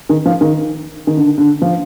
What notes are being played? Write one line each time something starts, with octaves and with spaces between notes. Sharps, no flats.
D#3
F3
D#3
D#3
D3
D3
F3